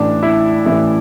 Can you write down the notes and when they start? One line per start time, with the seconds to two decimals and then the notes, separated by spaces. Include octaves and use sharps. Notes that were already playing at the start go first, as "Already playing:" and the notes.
Already playing: A1 A2 E3 D4
0.23 E4
0.66 A1 A2 E3 E4